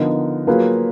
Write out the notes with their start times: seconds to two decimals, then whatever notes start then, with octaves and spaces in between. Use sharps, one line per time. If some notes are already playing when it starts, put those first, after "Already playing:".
Already playing: D3 F3 B3 D#4 A#4
0.47 F#3 A#3 F4 G#4 B4